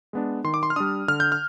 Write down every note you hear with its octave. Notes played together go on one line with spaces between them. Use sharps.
G#3 B3 D4
D#3 C6
D6
C6
F6
G3 D4 D#6
D3 F6
G6
F6